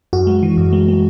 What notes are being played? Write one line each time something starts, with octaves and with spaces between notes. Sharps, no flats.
F#2 F#4
G#3
E3
F#2
G#3
G#3